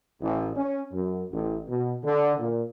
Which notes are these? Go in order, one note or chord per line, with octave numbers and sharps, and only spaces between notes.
A1
C#4
F#2
A1
B2
D3
A#2